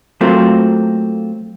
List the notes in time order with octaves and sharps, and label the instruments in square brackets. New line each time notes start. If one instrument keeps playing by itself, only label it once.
[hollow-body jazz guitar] F#3 A3 A#3 C4 F4